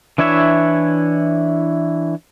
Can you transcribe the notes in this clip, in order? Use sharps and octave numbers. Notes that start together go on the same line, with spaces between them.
E3 D4 E4 C#5 E5